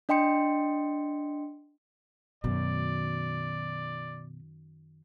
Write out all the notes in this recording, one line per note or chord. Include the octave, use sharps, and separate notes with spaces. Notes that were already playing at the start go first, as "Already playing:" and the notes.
D4 D#5 G5 C6 C#7
F#2 B2 D#3 D5